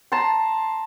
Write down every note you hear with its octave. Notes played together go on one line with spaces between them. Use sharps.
A5 A#5 C6